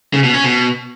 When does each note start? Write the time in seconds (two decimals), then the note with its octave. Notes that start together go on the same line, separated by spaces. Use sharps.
0.13 C#3
0.24 B2
0.34 C#4
0.44 B2